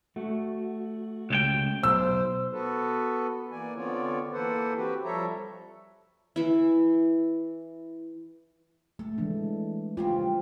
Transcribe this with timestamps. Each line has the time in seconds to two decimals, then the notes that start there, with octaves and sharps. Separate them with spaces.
0.16 A3 F#4
1.30 C#2 G4 G5
1.84 B1 C5 E6
2.51 B3 F#4 A4 B4
3.52 E3 A#3 D5 G#5
3.76 D3 B3 C4 F4 C#5 D5
4.33 E3 A#3 A4 B4 C5 F#5
4.75 C4 F#4 G4 B4
5.05 F3 G3 A4 C#5 E5 A#5
6.36 E3 E4
8.99 A3 A4
9.18 E3 G#3 D4
9.97 C#3 G3 C4 F4